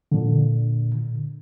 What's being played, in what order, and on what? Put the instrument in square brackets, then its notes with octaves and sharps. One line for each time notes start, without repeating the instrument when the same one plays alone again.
[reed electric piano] A#2 D3